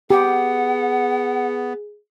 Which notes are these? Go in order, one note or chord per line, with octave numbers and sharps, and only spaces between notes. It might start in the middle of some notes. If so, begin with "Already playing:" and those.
B3 G4 G#4 F#5